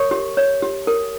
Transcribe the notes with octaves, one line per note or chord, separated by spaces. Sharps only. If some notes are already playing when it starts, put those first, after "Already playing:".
Already playing: A#4 C#5 C#6
G4
C#5
G4
A#4